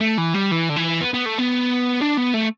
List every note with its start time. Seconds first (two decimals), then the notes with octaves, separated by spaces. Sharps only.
0.01 A3
0.18 E3
0.34 G3
0.52 E3
0.70 D3
0.76 E3
1.01 B3
1.14 B3
1.26 A3
1.39 B3
2.01 D4
2.17 B3
2.34 A3